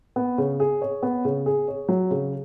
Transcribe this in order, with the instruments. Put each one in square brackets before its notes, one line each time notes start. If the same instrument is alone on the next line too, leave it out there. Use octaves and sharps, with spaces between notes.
[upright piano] B3
C#3
G#4
C#5
B3
C#3
G#4
C#5
F#3
C#3